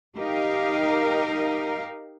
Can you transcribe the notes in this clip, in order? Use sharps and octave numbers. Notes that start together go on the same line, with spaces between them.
D#4 G4 A#4 D#5 F5